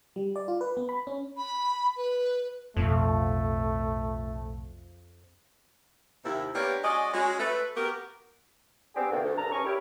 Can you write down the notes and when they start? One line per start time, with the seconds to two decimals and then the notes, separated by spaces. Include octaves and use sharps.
0.16 G3
0.36 D5
0.48 F4
0.61 B4
0.77 B3
0.89 B5
1.07 C#4
1.37 B5
1.97 B4
2.77 B1 F2 A2 A3
6.24 D#2 C3 E4
6.54 A#3 B3 D4 G4 A#4 C#5
6.83 G#3 C#4 F#4 D5 D#5
7.13 G#3 C#4 F#4
7.39 A3 B4
7.76 B3 F#4 G4 A#4
8.93 B3 C4 D4 G4 G#4
9.10 B2 D3 D#3 A3 A#3
9.23 D2
9.36 C2 G2 A5 A#5
9.51 G2 C#4 G#4 C#6
9.63 E4 G4 A#4 C#5 B5